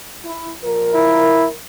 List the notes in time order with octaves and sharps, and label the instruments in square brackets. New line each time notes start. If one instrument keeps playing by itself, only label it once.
[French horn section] E4
A#2 F3 A#4
[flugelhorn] E4